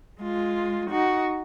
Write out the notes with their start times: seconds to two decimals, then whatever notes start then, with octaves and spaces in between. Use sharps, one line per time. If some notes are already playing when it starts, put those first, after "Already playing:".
0.23 G#3 F4
0.90 D#4 F#4